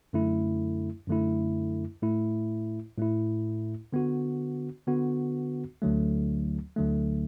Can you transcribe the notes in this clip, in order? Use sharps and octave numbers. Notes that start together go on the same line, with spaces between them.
F#2 D3 A3 E4
F#2 D3 A3 E4
A2 A3 E4
A2 A3 E4
D3 B3 F#4
D3 B3 F#4
D2 D3 F#3 A3
D2 D3 F#3 A3